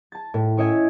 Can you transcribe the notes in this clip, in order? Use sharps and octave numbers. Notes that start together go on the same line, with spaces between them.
A5 A6
A2
C#4 E4 C#5 D#5 E5 G#5